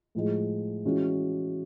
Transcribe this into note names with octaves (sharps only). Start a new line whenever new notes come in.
A2 F3 G#3
E3 G#3 C#4 F#4